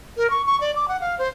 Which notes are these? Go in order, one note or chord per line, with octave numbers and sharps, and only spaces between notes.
A#4
C#6
C#6
D5
D6
F#5
F5
C5